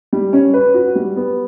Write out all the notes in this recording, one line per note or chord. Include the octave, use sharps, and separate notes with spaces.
G3
C#4
B4
F#4
G3
B3